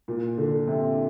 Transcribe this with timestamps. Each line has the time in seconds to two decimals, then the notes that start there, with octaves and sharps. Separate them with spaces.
0.08 A#2
0.38 D3
0.68 C3